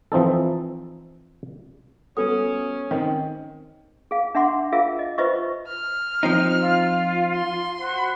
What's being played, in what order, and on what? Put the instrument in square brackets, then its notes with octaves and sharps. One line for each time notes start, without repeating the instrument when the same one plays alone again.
[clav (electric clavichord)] E3 F3 C4 D#4 A4
[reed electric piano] G3 B3 F#4 [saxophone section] C#4 [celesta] A4 D#6
[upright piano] D#3 [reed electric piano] C4 C#4
[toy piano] G#4 F5
D4 E5 F#5 C6 D6
F4 G#4 A#4 E5 F5
D#5
F4 B4 C5 D#5 E5 C#6
[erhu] F6
[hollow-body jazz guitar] F3 C4 D#4
[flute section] F4
[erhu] C6
[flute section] F#4 C5